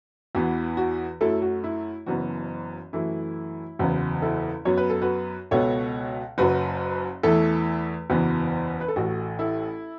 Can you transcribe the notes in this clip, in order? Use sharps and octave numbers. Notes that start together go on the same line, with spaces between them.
E2 E3 B3 F#4
F#4
F#2 F#3 A3 E4 A4
F#4
E4
F#1 F#2 E3 B3 F#4
F#2 E3 A3 E4
F#1 E2 C#3 F#3 B3
E4 A4
F#2 F#3 B3 C#5
B4
A4
F#4 B4
C#2 B2 B3 A4 C#5
F#1 F#2 F#3 F#4 B4
E2 E3 A3 E4 A4
F#1 E2 E3 B3 F#4
B4
A4
A1 A2 A3 F#4
E4 A4